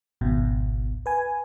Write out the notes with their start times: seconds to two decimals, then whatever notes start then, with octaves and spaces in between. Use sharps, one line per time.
0.21 G#1 C#2 G#2 B2
1.06 B4 G#5